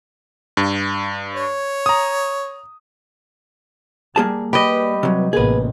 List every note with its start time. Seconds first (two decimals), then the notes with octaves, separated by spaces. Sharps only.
0.57 G2
1.35 C#5
1.86 A#5 D#6
4.16 G3 A#3 G#4 A5
4.53 G3 G4 B4 D#5 B5
5.03 C3 F#3
5.33 A1 C3 A#3 B3 G#4 B4